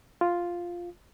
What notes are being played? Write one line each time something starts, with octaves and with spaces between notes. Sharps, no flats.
F4